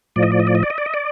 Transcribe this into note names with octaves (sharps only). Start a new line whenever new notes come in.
A2 F3 D5
D#5
D5
D#5
D5
D#5
D5
D#5
D5
D#5
D5